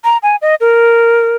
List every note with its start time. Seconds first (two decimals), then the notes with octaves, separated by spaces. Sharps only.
0.04 A#5
0.23 G#5
0.42 D#5
0.61 A#4